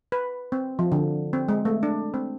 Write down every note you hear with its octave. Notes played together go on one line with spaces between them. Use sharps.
B4
C4
F3
D3
C4
G#3
A3
D4
C4